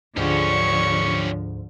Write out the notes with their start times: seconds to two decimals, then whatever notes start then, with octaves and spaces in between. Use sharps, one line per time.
0.17 D2 G#2 D3 F3 C#4 G4 C#6